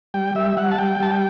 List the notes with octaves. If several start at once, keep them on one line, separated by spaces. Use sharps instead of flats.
G3 G5
G3 E5
G3 F#5
A5
G3 G5
G3 A5
G5